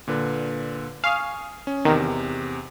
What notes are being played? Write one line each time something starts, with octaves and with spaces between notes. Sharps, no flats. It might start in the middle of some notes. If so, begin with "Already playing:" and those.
A#2 D3 B4
F5 G#5 C#6 D#6
C#4
E2 C3 D#3